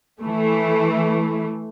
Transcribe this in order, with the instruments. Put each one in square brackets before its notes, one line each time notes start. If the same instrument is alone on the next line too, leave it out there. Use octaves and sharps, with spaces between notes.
[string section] E3 A3